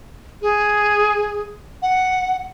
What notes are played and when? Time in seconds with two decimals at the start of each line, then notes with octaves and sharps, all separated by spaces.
0.42 G#4
1.82 F#5